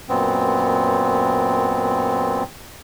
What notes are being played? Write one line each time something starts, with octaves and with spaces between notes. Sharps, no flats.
F#2 A#2 B3 C4